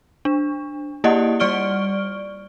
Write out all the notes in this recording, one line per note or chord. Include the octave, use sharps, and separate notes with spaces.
D4
A#3 E4 G4 D5 D#5 F#5
G3 D5 C#6 F6 D7 G7